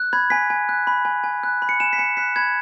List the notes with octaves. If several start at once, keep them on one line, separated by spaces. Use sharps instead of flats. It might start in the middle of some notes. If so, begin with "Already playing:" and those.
Already playing: F#6
B5 G#6
G#5 B6
G#5
F#6
B5
G#5
G#5
F#6
B5
C#7
G#5 E7
B6
G#5 C#7
F#6 B6
B5 G#6